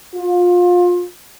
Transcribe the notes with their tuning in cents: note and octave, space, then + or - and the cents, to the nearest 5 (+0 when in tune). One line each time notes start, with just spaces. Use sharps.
F4 +25